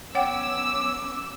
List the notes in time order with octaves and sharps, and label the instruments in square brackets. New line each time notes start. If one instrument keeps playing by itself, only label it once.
[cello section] F#3 B3 C#4 [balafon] C#5 F#5 G5 [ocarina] D6 [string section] E6